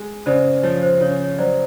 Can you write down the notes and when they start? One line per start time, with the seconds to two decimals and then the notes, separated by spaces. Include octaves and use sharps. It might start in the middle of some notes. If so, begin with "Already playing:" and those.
Already playing: G#3
0.26 C#3 C5 D5
0.63 F3 C#5
0.83 C5
1.01 C#3 C#5
1.21 C#5
1.38 F#3 C5 D5